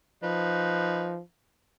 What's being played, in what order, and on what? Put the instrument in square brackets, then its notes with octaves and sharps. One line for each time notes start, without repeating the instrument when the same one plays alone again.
[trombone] F3 [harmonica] D#4 B4